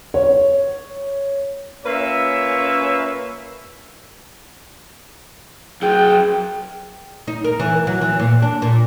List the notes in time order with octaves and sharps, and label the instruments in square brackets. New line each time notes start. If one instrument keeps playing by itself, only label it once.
[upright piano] C#5
[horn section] A#3 C#4 F4 B4 C#5 E5
[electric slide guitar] F#2 G5 [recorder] G#4
[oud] D#4
A#4
E3
F#3
E3
A#2
D4
A#2